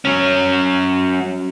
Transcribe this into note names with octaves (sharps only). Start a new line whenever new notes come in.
F#3 C#4